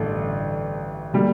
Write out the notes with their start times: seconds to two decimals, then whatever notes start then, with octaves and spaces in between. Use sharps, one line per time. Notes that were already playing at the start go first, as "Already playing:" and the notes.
Already playing: A1 G2 D3 A3 D4
1.13 D3 G3 A#3